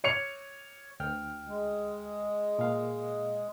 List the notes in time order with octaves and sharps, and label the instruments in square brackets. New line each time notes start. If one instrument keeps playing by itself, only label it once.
[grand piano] C#5 C#7 F7
[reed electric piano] D2 G5 F6
[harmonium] G#3
[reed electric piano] A#2 F5